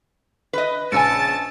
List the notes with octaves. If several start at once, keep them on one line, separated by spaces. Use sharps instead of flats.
B4 D#5
A#1 C#3 G#5 A5 E6 A6 C#7